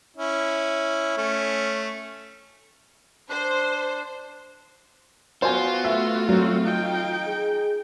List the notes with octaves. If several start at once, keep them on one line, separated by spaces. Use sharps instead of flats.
C#4 E4
A3 C#4
D4 C5
B3 F4 F#4 C5 G#5
A3 E5
F#3 C4 F#4
D#4 G5
G#4